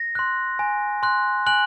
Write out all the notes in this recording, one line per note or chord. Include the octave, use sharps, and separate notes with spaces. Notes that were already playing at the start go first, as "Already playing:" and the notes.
Already playing: A#6
C6 F#6
G#5
C6 F#6
G#5 F#6 F#7